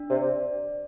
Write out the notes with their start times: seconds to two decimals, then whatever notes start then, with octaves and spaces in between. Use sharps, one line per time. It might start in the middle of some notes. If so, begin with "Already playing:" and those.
Already playing: D4
0.10 C3 D5